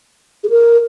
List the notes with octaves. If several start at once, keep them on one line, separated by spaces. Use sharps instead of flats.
G#4
A#4